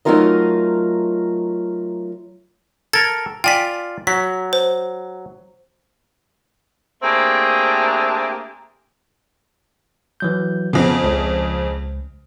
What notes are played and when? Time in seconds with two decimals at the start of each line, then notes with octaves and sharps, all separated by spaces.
0.05 F#3 A3 D#4 F4 A#4 D#5
2.93 A4 A#4 G#6 A6
3.44 F4 D5 G5 G#5 B6
4.07 F#3 B6
4.53 C5
7.03 A3 A#3 C4 D4 G4 G#4
10.20 E3 F#3 G6
10.73 F2 C#3 B3
11.04 C#2